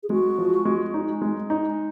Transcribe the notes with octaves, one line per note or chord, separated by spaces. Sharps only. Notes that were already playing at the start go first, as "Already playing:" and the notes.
G#4
G#3 F#4
F3
G#3
D#4
G#3
D#4